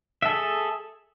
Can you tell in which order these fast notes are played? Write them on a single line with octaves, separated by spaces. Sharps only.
E5 A4 G#4